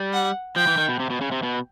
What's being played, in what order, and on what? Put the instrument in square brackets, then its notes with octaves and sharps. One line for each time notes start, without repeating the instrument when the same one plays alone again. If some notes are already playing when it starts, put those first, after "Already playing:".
Already playing: [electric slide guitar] G3
[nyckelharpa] F#5
[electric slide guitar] F3 [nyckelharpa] G5
[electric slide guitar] E3
D#3
B2
C3
B2
C#3
C3
B2